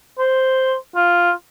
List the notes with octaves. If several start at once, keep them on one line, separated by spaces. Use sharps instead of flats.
C5
F4